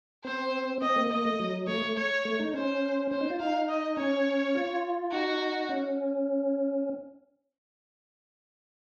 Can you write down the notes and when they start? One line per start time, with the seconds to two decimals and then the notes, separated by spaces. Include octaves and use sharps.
0.24 C4 C5
0.82 C4 D#5
0.96 A#3
1.10 A#3 D#5
1.25 A3
1.40 F#3
1.67 A3 C#5
1.82 A3
1.97 C#5
2.25 A3
2.39 D#4
2.54 C#4 C5
3.11 C#4 C5
3.21 D#4
3.30 F4
3.39 D#4 F5
3.69 D#5
3.97 C#4 C#5
4.55 F4
5.11 D#4 F#4
5.69 C#4